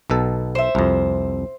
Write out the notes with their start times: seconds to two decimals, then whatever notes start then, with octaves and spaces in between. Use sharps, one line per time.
0.10 B1 B2 A4
0.55 C5 E5
0.75 C2 F2